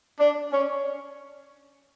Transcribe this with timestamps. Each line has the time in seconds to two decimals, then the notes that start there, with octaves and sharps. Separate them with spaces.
0.19 D4
0.52 C#4